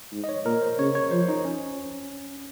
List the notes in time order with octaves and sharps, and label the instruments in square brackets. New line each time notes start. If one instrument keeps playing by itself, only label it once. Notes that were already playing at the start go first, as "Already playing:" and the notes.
[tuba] G#2
[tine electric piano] D#5
C#5
[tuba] A#2 [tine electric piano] A#4
[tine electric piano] C5
[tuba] C#3 [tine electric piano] C#5
[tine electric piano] C#5
[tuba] F3 [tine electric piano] C5
[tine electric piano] D#4
C#4